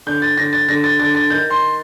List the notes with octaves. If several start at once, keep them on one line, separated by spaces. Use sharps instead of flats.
D3 G6
A6
D3 A#6
A6
D3 A#6
A6
D3 A6
A6
D#3 G6
C6